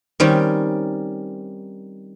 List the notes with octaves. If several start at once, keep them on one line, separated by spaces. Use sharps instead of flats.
D#3 G3 C4 C#4